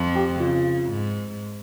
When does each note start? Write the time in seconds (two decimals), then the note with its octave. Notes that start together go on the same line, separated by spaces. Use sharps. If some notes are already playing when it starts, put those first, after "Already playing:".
Already playing: F2 F3
0.15 G4
0.40 C#3 F4
0.90 G#2